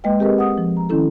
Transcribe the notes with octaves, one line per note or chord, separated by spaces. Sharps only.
G#3 A#3 B4 D#5 G5
C4 G4 G#4 A#4 B4 D#5
F#5 D#6
F3
A#5
D#3 C#4 E4 A4